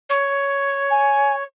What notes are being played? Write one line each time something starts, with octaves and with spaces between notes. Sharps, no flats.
C#5
G#5